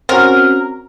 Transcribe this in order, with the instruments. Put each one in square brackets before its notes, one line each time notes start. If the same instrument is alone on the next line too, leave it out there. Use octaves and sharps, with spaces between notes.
[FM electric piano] C4 C#4 F#4 [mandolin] A#4